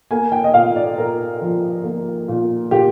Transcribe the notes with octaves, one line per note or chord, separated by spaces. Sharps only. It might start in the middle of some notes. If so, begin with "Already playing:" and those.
A#3 G#5
G5
D#5
A#2 F5
D5
A#2 A#4
F3
A#3
A#2
A#2 G4